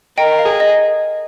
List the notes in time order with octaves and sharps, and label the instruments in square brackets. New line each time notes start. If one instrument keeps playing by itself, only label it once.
[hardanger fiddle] A#4 [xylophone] D#5 G5
[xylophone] F5
[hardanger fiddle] G#4
[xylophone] D#5